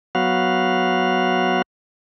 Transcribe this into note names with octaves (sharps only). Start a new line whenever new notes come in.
F#3 B3 F#4 F5